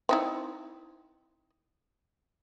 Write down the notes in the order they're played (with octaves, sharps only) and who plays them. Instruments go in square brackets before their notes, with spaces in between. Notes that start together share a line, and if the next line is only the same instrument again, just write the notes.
[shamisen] C4 D#4 E4